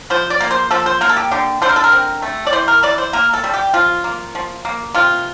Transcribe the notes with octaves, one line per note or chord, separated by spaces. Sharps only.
F3 C5
D5
A#3
C5
F3 A4
C5
A#3 A#4
A4
G4
D3 G4
D3 C5
A#4
A4
A#4
C4
A3
D5
E3 C5
A#4
E3 D5
C5
A#3 A#4
A4
G3
G4
F3 F4
A#3
F3
A#3
C3 F4